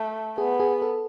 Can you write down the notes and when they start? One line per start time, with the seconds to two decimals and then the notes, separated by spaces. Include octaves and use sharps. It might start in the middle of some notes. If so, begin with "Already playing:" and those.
Already playing: A3
0.38 B3 G#4
0.60 G#4
0.82 A4